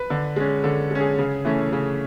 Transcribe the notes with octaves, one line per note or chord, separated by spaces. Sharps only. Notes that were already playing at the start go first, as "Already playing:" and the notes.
Already playing: B4
D3
G#3 C#4
D3 A4
G#3 C#4
G#4
C#3
E3 A3 C#4
C#3